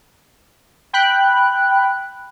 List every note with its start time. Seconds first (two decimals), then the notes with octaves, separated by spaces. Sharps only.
0.93 G5 B5 F#6